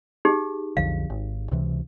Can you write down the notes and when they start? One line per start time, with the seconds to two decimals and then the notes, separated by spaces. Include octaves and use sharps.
0.25 D#4 G4 G#4
0.77 B1 F2 D3 F5
1.10 G#1
1.51 C#2 C3 E3